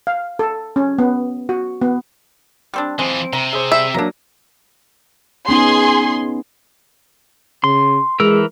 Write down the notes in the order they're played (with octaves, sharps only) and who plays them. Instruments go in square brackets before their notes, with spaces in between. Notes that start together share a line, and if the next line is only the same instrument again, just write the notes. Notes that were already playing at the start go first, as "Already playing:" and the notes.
[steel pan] F5
A4
C#4
B3
F#4
B3
[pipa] G3 C4 D4
[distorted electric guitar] E3 F4 [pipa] G#3 [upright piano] C4
[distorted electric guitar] C3 [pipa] A#5
[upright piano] G#4 C5 [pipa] E5
[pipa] G3 [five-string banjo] E5
[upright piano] F#3 A#3 [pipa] D4 A#5
[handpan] B3 C#4 D#4 [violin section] G#4 C6
[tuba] C#3 [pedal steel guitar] C6
[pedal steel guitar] E3 A#4 E6 [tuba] G#3